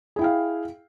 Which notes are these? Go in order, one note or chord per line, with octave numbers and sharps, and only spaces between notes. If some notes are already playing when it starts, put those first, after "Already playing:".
E4 G#4 F5 G5